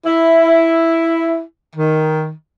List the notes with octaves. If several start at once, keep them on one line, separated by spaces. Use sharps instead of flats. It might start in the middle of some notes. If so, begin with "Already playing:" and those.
E4
D#3